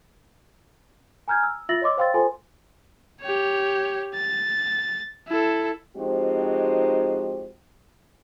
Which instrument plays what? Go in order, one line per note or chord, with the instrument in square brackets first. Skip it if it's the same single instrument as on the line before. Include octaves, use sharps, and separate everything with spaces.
[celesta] G#5 A#5 F6 G6 G#6
E6
F4 E5 E6 A6 A#6 F#7
C#5 D#5 C6 D6 E6
C5 F5 G5 C6 E6 A6
F4 A4 C5 G#5 C6
[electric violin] G4 C#5
A6
E4 A4
[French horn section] F3 G#3 C4 D#4 F#4 G4